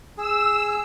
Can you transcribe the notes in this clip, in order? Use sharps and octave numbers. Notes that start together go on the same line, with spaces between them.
G#4 E6